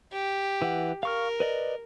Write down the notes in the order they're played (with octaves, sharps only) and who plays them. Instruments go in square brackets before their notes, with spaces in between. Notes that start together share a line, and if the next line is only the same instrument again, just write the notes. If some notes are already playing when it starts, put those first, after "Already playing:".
[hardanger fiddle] G4
[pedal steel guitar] E3 F#5
[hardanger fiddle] A#4 [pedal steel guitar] F5 C#6 F6
[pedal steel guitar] B4 D5 D#5